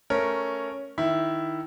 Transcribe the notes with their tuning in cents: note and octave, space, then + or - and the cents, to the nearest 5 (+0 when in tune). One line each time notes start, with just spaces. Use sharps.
A3 +0 C#4 +0 A#4 +0
D#3 +0 E4 +0 E5 +0